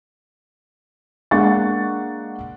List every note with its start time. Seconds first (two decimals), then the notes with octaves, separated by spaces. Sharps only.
1.31 G#3 A#3 D4 F#5 C#6 A6